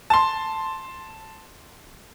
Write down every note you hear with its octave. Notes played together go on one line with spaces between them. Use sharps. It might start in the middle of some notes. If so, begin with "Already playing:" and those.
A5 C6